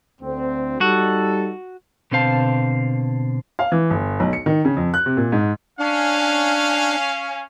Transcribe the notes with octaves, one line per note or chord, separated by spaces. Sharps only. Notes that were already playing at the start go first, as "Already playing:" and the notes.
D2 C4
G3 D#4 F#4 A4
B2 D3 C4 C5 F5 A5
F5
E3
G1
B1
C#7
D#3
C#3
F2
F#6
C3
A#2
G#2
C#4 D4 F5